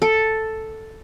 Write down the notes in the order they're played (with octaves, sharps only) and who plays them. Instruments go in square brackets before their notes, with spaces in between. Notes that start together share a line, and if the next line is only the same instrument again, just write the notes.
[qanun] A4